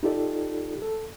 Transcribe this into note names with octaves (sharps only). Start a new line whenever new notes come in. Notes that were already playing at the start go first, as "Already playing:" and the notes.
D#4 F4 G4 A4 D5
A4